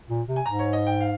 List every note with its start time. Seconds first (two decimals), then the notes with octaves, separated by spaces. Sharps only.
0.09 A#2
0.28 C3
0.36 G#5
0.46 G#2 A#5
0.59 C#5
0.73 D#5
0.87 G5
1.01 F5